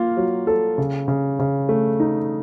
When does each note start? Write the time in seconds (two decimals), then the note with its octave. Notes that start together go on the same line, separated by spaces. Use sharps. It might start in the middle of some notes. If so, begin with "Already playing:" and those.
Already playing: A#3 F4
0.17 F#3
0.47 A4
0.78 C#3
1.08 C#3
1.39 C#3
1.69 A3
2.00 D#4